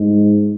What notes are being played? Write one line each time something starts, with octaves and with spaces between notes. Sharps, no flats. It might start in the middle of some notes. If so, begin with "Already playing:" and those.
Already playing: G#2